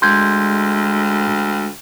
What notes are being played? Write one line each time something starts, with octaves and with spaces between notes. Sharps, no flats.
D2 G#3 C6 G6 G#6